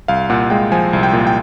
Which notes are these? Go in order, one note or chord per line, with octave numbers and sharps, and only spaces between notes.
C2 F5
A#2 F#5
G#3 G5
F3 G#5
C2
G5
A#2
G5